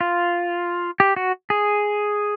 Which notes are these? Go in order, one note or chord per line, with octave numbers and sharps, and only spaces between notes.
F4
G4
F#4
G#4